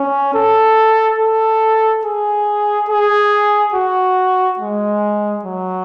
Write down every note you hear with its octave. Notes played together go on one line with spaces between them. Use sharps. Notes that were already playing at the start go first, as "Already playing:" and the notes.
Already playing: C#4
A4
A4
G#4
G#4
F#4
G#3
F#3